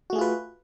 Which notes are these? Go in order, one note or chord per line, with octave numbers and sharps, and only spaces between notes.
A3 F4 F#4 G#4 B4